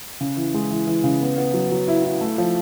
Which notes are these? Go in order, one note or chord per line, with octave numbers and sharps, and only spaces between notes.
C#3
E3
G#3
E3
E3
C#3
B3
B3
F#3
F#3
E4
E4
A3
F3